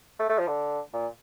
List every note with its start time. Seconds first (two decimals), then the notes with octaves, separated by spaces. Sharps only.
0.19 A3
0.30 A3
0.39 F3
0.47 D3
0.93 A#2